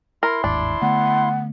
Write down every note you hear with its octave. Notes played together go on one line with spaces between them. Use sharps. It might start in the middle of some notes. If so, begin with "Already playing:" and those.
E4 A#4 C6
G1 D#2 G#2 D4
D3 A3 B3 F#5